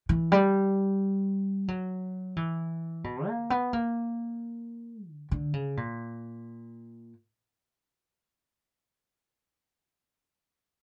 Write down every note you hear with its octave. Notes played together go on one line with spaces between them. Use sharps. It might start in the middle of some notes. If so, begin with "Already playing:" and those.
E3
G3
F#3
E3
B2
A#3
B3
A#3
D3
D3
C#3
A#2